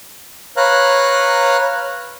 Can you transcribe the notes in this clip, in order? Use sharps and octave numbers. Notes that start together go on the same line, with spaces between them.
B4 C#5 F5 A#5 F#6